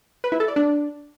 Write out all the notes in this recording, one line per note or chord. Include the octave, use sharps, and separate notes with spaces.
B4
E4
A4
D5
D4